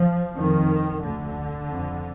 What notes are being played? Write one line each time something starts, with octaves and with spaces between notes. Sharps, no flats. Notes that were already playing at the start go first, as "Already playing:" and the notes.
Already playing: F3
F2 D#3
D2 D3
F2